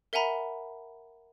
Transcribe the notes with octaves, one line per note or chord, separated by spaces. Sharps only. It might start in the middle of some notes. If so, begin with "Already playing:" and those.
A#4 E5 F#5 G#5 A#5 B5